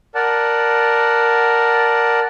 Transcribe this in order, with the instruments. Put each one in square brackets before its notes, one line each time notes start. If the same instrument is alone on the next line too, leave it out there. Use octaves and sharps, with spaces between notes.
[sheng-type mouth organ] A#4 D5 F#5 A5